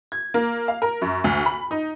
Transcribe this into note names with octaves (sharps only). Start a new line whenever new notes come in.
G#6
A#3
F5
A#4
F#2
D2
B5
D#4